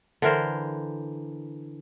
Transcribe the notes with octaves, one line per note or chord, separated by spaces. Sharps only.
D3 E3 A#4 C5